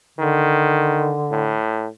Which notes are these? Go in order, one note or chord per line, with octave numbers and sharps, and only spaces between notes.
D3 D#3
A2